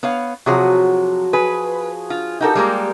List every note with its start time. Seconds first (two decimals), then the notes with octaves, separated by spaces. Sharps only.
0.03 B3 C#5 F5
0.46 C3 F3 F#3 F#4 G#4 F#5
1.33 G#4 B4
2.10 F4
2.41 D#4 F#4 G4 A4 A#4 G5
2.55 G3 G#3 A#3